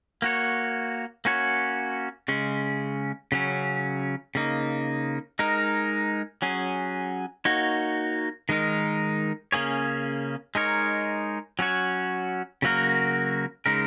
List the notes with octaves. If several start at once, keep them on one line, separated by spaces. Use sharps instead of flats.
A#3 F#4 C#5
A#3 C#4 F#4 C#5
C#3 G#3 C#4
C#3 F#3 C#4
C#3 A#3 D#4
G#3 D#4 A#4
F#3 C#4 G#4
A#3 D#4 F#4 C#5
D#3 G#3 D#4 A#4
C#3 A#3 C#4 G#4 C#5
G#3 D#4 A#4 C#5
F#3 C#4 F#4 C#5
C#3 F#3 A#3 F#4 A#4
C#3 G#3 D#4 A#4